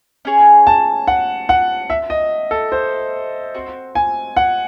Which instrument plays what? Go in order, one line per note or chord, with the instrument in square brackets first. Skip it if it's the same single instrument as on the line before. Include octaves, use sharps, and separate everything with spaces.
[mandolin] C#4 G#4 C#5
[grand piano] A5
F#5
F#5
E5
D#5
A4
C5
[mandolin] C4 F#4 C5
[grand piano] G#5
F#5